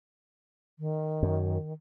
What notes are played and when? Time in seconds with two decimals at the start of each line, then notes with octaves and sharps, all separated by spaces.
0.79 D#3
1.23 F#2